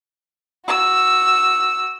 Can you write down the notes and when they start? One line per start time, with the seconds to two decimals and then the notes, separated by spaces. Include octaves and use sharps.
0.66 F#4 E6